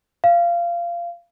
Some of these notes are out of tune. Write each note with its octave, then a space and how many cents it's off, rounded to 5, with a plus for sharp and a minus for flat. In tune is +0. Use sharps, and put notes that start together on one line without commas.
F5 -20